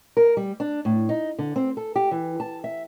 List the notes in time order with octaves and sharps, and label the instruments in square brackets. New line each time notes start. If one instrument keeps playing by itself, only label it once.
[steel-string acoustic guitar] A#4
G3
D4
A2
D#4
D3
C4
A4
G4
E3
A5
E5